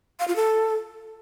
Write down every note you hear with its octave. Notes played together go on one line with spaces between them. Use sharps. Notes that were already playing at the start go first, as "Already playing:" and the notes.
F5
F4
A4